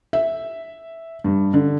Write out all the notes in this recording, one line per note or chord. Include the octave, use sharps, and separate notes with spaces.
E5
G2
D3